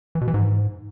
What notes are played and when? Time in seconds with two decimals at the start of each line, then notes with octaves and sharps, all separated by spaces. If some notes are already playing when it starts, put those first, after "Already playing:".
0.15 E3
0.21 B2
0.28 E3
0.34 G#2